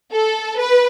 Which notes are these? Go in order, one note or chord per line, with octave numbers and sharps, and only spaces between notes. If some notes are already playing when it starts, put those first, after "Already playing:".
A4
B4